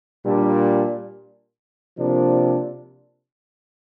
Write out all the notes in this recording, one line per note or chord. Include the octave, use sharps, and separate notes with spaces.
A#2 G3 D4
C3 F3 A#3 D4